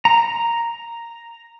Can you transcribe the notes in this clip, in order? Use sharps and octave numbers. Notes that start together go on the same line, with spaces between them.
A#5